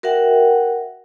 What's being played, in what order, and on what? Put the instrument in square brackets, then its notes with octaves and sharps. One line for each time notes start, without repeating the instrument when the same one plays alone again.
[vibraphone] F#4 A#4 E5 F#5 G5